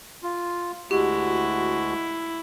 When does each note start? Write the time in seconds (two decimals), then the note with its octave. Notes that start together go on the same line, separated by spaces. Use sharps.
0.23 F4
0.91 D2 G#3 E4 F#4 G4